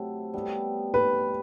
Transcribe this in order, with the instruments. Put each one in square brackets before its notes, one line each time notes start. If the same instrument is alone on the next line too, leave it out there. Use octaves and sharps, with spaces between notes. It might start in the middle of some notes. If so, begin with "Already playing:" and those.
Already playing: [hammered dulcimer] C3 F#3 A3 E4
G3 B3 E4
[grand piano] B4